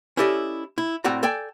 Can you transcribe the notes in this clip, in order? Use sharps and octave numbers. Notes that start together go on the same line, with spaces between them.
C#4 E4 G4 A4 D5 D#5
E4
A2 C4 F#4 D5 F#5 A#5
A4 D5 G5 G#5